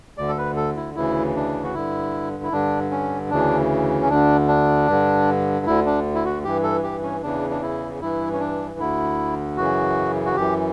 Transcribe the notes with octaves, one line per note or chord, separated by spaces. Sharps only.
D2 D3 D5
A4
B4
A4
E4
D2 C#3 E3 E4
D4
F#4
G2 D3 E4
E4
G2 D3 D4
C#4
D2 C#3 E3 D4
C#4
D2 D3 D4
D4
G2 D3
D2 D3 E4
D4
E4
F#4
G2 E3 G4
A4
G4
C#4
E2 C#3 E3 D4
D4
E4
G2 E3 E4
C#4
D4
D2 D3 E4
F#2 C#3 E3 F#4
F#4
F#2 E3 G4